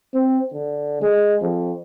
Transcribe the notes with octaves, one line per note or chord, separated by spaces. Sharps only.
C4
D3
G#3
F2